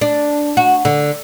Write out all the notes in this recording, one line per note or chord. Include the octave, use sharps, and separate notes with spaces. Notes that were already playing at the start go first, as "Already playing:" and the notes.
D4
F#4
D3